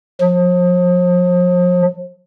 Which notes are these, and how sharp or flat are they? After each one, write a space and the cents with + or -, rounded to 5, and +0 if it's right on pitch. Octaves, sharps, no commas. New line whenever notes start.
F3 +40